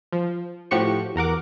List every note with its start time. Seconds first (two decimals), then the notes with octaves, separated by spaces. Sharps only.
0.13 F3
0.71 A2 F3 F#4 G4 C#6 C#7
1.15 E2 A#4 F#5 D6